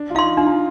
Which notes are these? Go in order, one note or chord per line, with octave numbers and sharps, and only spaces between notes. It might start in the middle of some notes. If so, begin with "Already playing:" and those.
Already playing: D4
F4
D#4 F5 C6
D4 F4
D#4